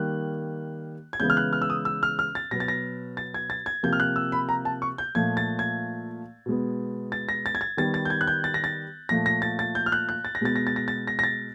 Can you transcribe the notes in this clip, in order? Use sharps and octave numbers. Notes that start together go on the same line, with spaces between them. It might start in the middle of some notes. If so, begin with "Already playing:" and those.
Already playing: D#3 G3 A#3 F#6
G#6
C#3 E3 G#3 B3 G6
F6
F#6
F6
E6
D#6
E6
F6
F6
A6
B2 F#3 B3 A#6
A6
A#6
A6
G#6
A6
G#6
C3 F3 A#3 G6
F6
F#6
E6
B5
A#5
A5
C#6
G6
A#2 F3 A3 G#6
A6
G#6
B2 G#3 B3
A6
A#6
A6
G#6
A6
D#3 G3 B3 A6
A6
G6
G#6
F#6
G6
A6
A#6
A6
A#2 F3 A3 A#6
A#6
A6
A6
G6
F6
F#6
F#6
A6
A#6
B2 G#3 B3 A6
A#6
A6
A#6
A6
A#6
A#6
A6